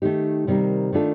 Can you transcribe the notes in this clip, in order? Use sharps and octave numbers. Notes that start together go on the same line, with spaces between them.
D#3 A3 D#4 G4
C3 D#3 G3 A#3
D#3 A3 D4 F4 A4